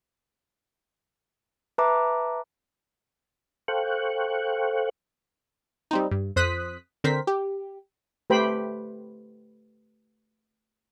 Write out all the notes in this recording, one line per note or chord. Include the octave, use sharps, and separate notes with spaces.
B4 E5 A5 A#5 D6
A4 C5 F5 G5 C#6 F#6
G3 C4 D#4
G2
F2 C5 D#6 F#6 B6
D3 C4 A#4 C5 B6
G4
A3 G4 B4 C5 G5 B5